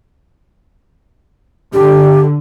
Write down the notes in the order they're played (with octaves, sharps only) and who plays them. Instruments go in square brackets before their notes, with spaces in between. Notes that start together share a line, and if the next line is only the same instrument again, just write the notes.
[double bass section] D3 [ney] G4